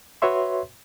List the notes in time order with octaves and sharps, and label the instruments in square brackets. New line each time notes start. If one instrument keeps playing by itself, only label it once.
[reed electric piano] F#4 B4 C#5 E5 C6